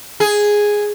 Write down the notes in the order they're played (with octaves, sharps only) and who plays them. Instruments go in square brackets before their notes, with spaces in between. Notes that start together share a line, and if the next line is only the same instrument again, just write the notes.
[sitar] G#4